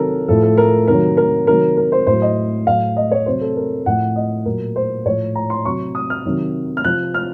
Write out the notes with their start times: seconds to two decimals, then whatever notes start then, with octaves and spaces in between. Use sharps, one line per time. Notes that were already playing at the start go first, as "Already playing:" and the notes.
Already playing: C3 D#3 F#3 A4 A#4
0.28 A2 F3 A4
0.43 A4
0.58 A#4
0.87 C3 D#3 F#3 A#4
1.17 A#4
1.47 C3 D#3 F#3 A#4
1.77 A#4
1.92 C5
2.07 A2 F#3 C5
2.22 D#5
2.67 A2 F#3 F5
2.97 D#5
3.11 C#5
3.26 C3 F#3 C5
3.41 A4
3.57 A#4
3.86 A2 F3 F#5
4.16 D#5
4.46 A#2 F#3 A#4
4.76 C5
5.05 A2 F3 C#5
5.35 A#5
5.50 C6
5.65 C3 F#3 C#6
5.95 D#6
6.10 F6
6.25 C3 D#3 F#3
6.77 F6
6.84 C3 F3 F#6
7.14 F6